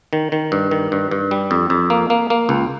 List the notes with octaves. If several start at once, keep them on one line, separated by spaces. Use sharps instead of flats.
D#3
D#3
G2
D#3
G2
G2
G3
F2
F2
A#3
A#3
A#3
C#2